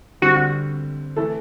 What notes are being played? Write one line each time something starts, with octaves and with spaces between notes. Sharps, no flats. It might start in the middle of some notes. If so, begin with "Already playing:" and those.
D3 G3 C4 F#4
E3 A3 E4 A4